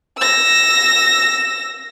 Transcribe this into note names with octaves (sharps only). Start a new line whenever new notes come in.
E6 A#6